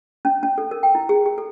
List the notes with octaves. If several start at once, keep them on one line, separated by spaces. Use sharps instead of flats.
C#4
C#4
A4
A#4
G5
E4
G#4
G#4
A4